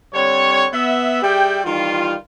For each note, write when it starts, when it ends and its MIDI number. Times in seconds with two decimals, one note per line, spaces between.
0.13 0.66 50
0.13 0.66 55
0.13 0.66 60
0.13 0.66 73
0.72 1.19 59
0.72 1.19 76
1.22 1.59 55
1.22 1.59 67
1.22 1.59 68
1.22 1.59 76
1.22 1.59 79
1.64 2.13 51
1.64 2.13 52
1.64 2.13 55
1.64 2.13 65